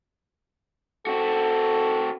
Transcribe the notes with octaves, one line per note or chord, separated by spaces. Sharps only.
C4 F#4 A4